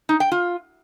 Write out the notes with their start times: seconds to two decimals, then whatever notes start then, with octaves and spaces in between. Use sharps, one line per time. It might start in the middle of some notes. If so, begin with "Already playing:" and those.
0.09 D#4
0.20 G5
0.32 F4